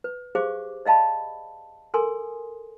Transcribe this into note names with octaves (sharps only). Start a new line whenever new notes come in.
B4
G4 G#4 C5 F5 C#6 D6
D5 D#5 F5 A5 B5
A4 A#4 G#5 C6 D#6